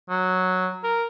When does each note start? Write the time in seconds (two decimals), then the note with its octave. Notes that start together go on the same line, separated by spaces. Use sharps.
0.10 F#3
0.84 A#4